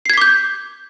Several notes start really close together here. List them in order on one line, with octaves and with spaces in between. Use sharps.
C7 G#6 B6 D6 G6